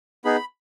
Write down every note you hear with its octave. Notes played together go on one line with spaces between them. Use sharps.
B3 D#4 G#4 B5